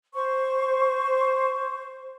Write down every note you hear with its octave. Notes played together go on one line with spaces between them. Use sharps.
C5 C#6